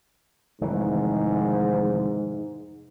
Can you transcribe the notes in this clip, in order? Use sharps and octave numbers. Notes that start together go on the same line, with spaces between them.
F1 G#2 D#3 E3